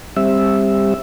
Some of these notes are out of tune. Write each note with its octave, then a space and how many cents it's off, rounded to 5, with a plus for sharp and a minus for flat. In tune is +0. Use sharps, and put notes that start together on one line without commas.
G3 +25 C4 +15 E5 +0